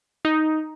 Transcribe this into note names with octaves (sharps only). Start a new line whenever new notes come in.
D#4